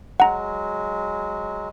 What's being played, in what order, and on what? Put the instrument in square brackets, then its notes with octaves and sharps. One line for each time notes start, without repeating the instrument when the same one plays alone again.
[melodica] F#3 G#3 [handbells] F#5 A#5